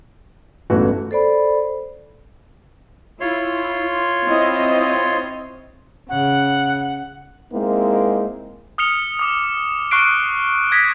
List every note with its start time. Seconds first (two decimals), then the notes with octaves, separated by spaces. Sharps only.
0.70 G1 C#2 A2 E3 A3 F#4
1.11 A4 C5 D5 B5
3.20 E4 F4 C#5 C6
4.26 C4 E4 D#5
6.09 C#3 F#5
7.53 G#3 A#3 C4 D#4 E4
8.78 D#6 F6 C#7 F7
9.19 D6 D#6
9.91 C#6 F6 F#6 C7 D7
10.72 D#6 G#6 A#6 B6